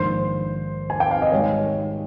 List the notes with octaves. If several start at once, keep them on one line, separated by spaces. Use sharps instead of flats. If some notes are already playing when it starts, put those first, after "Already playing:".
Already playing: A#1 G#2 D#3 C5
G#5
G5
F5
D#5
G#1 G#2 G3 C#5